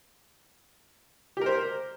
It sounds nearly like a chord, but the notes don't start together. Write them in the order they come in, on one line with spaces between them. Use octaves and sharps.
G4 A#4 C5